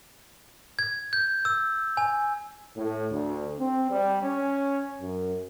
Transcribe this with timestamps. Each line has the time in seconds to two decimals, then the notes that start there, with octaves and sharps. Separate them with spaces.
0.79 G#6
1.13 G6
1.45 E6
1.97 G#5
2.77 A2
3.11 D2
3.59 C4
3.90 G3
4.23 C#4
5.00 F#2